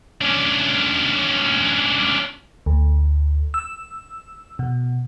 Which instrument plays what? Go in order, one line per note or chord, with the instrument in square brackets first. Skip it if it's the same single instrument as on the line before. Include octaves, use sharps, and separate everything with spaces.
[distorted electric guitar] C#4 D4
[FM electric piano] D2
E6
B2